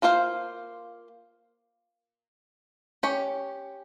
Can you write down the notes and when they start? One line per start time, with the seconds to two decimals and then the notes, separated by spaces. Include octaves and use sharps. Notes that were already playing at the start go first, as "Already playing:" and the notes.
0.02 A#3 F4 C5 F5
3.03 C#4 G4 C#5